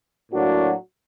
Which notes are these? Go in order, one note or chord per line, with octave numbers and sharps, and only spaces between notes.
A2 F#3 A#3 D4 F#4